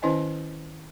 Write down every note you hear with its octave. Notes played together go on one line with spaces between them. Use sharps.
D#3 C#4 E4 C5 D#5 G#5